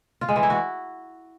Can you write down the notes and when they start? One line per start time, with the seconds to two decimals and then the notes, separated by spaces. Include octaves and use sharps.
0.21 F4
0.29 G#3
0.36 E3
0.43 E4
0.50 F#4